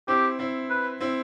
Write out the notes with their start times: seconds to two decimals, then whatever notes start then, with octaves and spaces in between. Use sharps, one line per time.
0.08 C4 E4 G4
0.39 C4 E4
0.70 B4
1.01 C4 E4